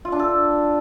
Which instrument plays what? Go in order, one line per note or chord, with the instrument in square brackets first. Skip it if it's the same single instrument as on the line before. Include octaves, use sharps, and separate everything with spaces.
[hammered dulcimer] F4
D4
A4